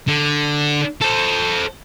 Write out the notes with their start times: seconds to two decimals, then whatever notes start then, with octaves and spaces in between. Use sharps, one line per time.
0.08 D3
1.01 A4 C5